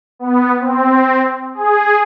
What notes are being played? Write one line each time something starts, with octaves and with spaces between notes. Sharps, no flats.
B3
C4
G#4